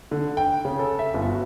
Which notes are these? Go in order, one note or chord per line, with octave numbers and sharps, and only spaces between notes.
D3
G5
C#3
A4
E5
G1
F#4